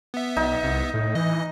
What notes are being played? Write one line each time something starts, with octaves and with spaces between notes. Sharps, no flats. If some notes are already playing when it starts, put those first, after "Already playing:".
B3 E5
B1 D#4
C2
A2
E3 D#5